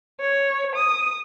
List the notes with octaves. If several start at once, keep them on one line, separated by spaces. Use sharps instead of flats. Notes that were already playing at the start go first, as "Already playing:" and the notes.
C#5
D#6